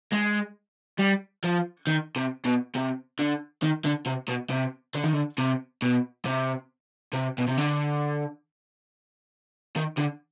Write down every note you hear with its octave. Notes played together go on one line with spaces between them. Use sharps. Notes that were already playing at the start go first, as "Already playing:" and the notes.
G#3
G3
F3
D#3
C3
B2
C3
D3
D#3
D3
C3
B2
C3
D3
D#3
D3
C3
B2
C3
C3
B2
C3
D3
D#3
D3